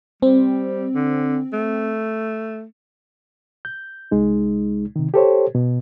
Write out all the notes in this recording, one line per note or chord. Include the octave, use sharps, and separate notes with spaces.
G3 C4
D3
A3
G6
C2 G#3 D#4
C3 D#3
G4 A4 C5 C#5
B2